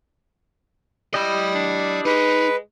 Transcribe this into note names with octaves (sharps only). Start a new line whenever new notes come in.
E4 G4 D5 D#5 B5
D4
G#3 D#4 B4